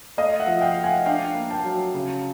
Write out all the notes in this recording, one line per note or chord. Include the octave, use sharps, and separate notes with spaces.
A3 D#5 F5
E5 F#5
F3
F5 G5
A3
F#5 G#5
D4 F5 G5
A#3
G5 A5
F#3
C#3